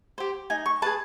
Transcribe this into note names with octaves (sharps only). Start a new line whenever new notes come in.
G4 C5
D#4 G#5
C#6
G#4 B4 A5